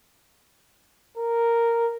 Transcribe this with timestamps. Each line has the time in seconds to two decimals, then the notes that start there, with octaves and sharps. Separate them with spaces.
1.18 A#4